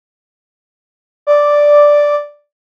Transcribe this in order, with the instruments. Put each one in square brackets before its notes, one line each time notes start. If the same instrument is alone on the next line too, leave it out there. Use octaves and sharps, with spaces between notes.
[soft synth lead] D5